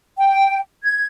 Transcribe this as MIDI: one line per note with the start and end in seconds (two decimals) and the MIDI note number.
0.18 0.58 79
0.84 1.06 92